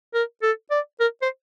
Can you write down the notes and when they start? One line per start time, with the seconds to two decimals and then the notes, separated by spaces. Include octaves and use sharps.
0.14 A#4
0.43 A4
0.71 D5
1.00 A#4
1.22 C5